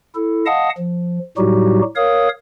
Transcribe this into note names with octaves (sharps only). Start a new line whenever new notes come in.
E4 A4
D#5 F5 F#5 A5 D#6
F3
A2 F#3 G3 D#4 F#4 G4
A#4 C#5 F5 D#6